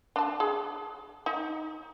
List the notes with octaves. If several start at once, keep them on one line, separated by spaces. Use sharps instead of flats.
D4 A5
G#4
D#4